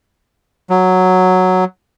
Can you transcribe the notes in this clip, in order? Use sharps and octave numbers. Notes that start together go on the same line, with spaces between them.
F#3